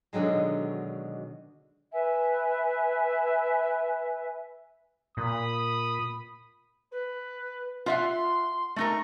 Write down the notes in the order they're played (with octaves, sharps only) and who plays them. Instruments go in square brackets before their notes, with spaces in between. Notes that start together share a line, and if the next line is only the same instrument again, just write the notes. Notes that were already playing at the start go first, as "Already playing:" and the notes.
[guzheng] B2 D3 D#3 F#3 G#3
[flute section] B4 E5 G#5
[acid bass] A#2 [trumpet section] B5 D#6
[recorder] B4
[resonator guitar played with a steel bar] F4 E5 F#5 [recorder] C6
[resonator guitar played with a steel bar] A3 D#4 A#4 [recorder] C#6